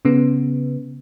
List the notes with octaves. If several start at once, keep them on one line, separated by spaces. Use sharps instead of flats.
C#3 B3